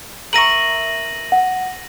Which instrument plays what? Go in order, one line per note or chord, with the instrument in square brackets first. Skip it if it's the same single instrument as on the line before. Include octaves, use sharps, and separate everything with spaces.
[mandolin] A#4 E5 C#6 [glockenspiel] A#6 D#7 F#7
[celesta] F#5